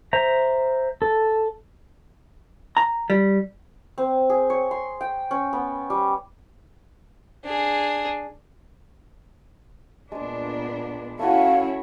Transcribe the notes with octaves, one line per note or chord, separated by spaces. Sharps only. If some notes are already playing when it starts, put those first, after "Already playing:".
C5 E5 A#5
A4
A#5
G3
C4
G#4
C#5
C6
G5
C#4
B3
G3
D4 G#4
A#2 G#3 B3 D4 C#6
A3 C#4 E4 F#4 C#5 F5